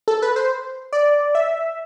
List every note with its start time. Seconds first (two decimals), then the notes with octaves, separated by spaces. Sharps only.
0.08 A4
0.22 B4
0.36 C5
0.93 D5
1.35 E5